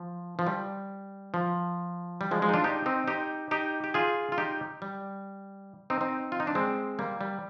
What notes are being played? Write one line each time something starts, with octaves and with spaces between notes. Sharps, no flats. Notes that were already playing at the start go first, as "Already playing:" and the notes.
Already playing: F3
F3
G3
F3
G3
F3 G#3
F3 G#3
D#4
D4 F4
D#4 G4
C4 D#4
D#4 G4
D#4 G4
G4
F4 G#4
F4
D#4 G4
G3
C4 D#4
C4 D#4
F4
D#4
D4
G#3 C4
G3 A#3
G3